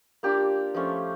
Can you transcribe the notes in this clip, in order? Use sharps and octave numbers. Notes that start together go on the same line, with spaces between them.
A#3 D4 F4 G4
F3 A3 C#4 F4